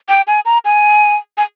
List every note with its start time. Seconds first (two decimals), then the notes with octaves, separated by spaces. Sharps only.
0.09 G5
0.27 G#5
0.45 A#5
0.65 G#5
1.37 G#5